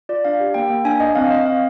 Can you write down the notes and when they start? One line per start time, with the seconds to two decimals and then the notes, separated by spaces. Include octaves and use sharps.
0.09 F4 D5
0.25 D4 F5
0.40 G4
0.54 A#3 G5
0.70 A#3
0.85 D4 G#5
1.00 D4 D#5
1.15 C4 F5
1.31 C4 D#5
1.46 C4 F5